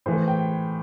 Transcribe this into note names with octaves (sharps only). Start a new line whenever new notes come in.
A2 E3 C5
G5